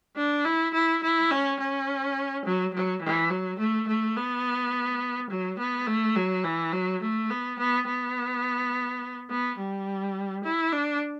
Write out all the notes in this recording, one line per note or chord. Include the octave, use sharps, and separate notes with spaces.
D4
E4
E4
E4
C#4
C#4
F#3
F#3
E3
F#3
A3
A3
B3
F#3
B3
A3
F#3
E3
F#3
A3
B3
B3
B3
B3
G3
E4
D4